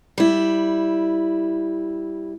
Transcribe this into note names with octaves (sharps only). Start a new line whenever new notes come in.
G3 E4